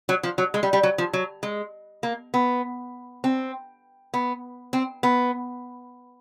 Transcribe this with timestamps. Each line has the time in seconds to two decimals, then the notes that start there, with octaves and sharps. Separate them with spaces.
0.09 F#3
0.23 F3
0.38 F#3
0.54 G#3
0.63 G3
0.73 G3
0.83 F#3
0.98 F3
1.13 F#3
1.43 G#3
2.03 A#3
2.34 B3
3.24 C4
4.14 B3
4.73 C4
5.03 B3